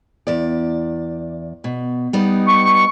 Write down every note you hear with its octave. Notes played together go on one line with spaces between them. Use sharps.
E2 D5
B2
G3 B3 D#4
C#6